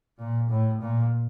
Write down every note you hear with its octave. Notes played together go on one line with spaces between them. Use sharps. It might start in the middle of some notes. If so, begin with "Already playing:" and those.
A#2
A2
A#2